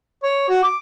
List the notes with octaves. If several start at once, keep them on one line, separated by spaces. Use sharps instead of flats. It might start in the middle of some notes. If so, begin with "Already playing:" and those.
C#5
F#4
D6